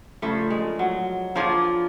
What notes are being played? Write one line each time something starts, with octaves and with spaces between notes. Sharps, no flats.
C#3 F3 A3 A#3 D4
G#3
F#3
F3 A#3 D4 F4 G#4 C#5